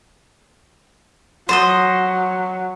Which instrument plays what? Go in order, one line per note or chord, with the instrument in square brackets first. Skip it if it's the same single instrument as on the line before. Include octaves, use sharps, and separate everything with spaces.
[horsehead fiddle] F#3 [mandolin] C5 D5 D#5